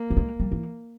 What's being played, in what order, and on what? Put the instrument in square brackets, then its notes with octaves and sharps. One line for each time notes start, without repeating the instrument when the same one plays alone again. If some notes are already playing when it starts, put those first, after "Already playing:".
Already playing: [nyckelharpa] A#3
[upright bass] G3
G#3
G3
E3